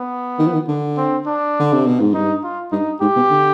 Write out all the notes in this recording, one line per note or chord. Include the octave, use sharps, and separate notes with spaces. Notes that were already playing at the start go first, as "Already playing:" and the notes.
Already playing: B3
D#3
F3
D#3
D3
C4
D4
D3
C3
B2
G#2
G2 D#4
F4
G2 D#4
G#2 G4
B2
D3